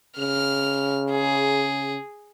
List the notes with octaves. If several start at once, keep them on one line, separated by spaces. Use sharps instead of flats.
C#3 F6
G#4